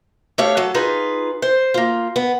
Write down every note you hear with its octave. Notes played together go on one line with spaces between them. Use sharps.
A3 G4 C#5 F5
F#3 A4
D#4 F4 G#4 B4
C5
A#3 F4
B3